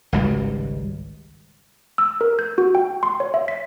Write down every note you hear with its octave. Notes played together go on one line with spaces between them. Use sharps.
G#1 C#2 G3
E6
A#4
G6
F#4
G5
C6
C#5
E5
B6